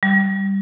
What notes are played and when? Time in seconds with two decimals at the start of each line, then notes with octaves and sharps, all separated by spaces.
0.03 G3